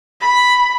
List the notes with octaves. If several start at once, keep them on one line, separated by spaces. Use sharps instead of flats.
B5